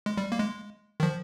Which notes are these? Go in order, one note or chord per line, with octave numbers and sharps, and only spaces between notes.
G#3
G3
A#3
G#3
D#3
F3